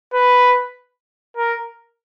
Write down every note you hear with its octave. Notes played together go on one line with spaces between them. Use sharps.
B4
A#4